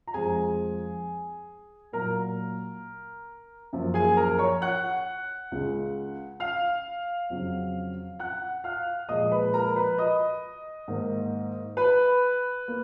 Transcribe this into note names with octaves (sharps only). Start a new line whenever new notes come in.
A#5
F2 F3 G#3 G#4 G#5
A#2 F#3 A#3 A#4 A#5
F#2 F3 A#3
G#4 G#5
A#4 A#5
C#5 C#6
F#5 F#6
C#2 C#3 G#3
F5 F6
F2 C#3 F#3
F#5 F#6
F5 F6
A#2 F3 G#3 D#5 D#6
B4 B5
A#4 A#5
B4 B5
D#5 D#6
G#2 D#3 A#3
B4 B5
A#3